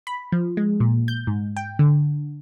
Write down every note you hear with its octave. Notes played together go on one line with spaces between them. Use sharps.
B5
F3
G#3
A#2
G6
G#2
G5
D3